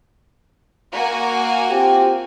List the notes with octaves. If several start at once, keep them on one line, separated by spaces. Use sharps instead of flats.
A#3 F#4 G#5
C4 F4 G4